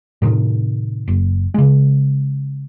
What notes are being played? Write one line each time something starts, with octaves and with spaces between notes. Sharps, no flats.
A2 C3 D#3
F#1
C#3 G#3